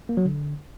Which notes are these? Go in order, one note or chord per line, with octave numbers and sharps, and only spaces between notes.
A#3
F#3
D3